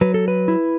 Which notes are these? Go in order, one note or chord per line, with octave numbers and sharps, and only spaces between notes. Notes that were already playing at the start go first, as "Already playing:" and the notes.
F#3 B4
A4
B4
E4